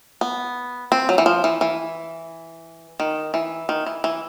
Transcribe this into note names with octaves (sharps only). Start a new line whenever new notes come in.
B3
C4
F#3
E3
F3
E3
E3
D#3
E3
D#3
E3
E3